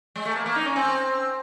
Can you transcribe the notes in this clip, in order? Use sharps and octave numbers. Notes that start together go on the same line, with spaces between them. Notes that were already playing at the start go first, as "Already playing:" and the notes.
G#3
A3
A#3
A#3
D#4
C#4
C4